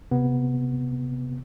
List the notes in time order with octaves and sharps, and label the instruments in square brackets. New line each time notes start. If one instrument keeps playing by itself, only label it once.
[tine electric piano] C3 B3